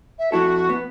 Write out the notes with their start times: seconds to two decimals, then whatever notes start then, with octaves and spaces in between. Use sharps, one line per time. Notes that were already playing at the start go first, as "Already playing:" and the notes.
0.19 E5
0.32 F2 E4 F#4 A4
0.69 B3